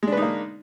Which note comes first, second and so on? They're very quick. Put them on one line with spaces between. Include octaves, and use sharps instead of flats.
G#3 D4 B4 D#4 A#3